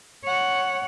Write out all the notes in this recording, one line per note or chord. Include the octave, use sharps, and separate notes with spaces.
C#5 F#5